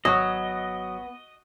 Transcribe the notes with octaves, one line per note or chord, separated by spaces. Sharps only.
G#1 F#3 B3 D#5